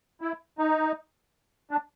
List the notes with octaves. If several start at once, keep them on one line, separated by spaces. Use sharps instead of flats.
E4
D#4
D4